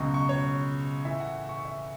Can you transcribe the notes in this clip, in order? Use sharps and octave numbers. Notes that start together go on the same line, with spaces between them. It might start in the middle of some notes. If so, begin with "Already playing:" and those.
Already playing: C#2 B2 F#3 C#6
C#6
C#5
A2 E3 E5
F#5
C#6
E5